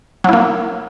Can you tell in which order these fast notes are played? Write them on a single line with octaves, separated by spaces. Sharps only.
F#3 E4 A#3